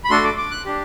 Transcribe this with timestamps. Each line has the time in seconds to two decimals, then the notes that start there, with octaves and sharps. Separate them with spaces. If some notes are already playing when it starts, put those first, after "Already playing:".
0.04 B5
0.10 A3 D4 F#4 A4 C6
0.24 D6
0.38 D6
0.51 F#6
0.66 D4 G4